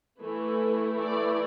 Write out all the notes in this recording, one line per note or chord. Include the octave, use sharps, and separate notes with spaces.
E3 A3 E4 B4
D5